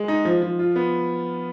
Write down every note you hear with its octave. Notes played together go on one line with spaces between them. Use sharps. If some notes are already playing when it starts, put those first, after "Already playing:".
Already playing: G#3
D#4
F3
F3
F4
B3